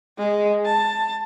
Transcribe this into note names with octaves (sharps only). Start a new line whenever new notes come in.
G#3
A5